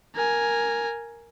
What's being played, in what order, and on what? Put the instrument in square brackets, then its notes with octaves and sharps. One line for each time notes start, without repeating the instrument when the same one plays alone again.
[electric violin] A#4 G#5